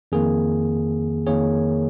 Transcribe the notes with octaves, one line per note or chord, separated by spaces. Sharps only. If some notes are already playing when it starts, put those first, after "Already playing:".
F2 D#3 A#3 G#4
F2 D#3 A#3 G#4 C#5